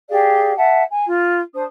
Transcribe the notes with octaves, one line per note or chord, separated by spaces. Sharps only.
G4 G#4 D5 F5
E5 F#5 A5
G#5
F4
D4 C5 D#6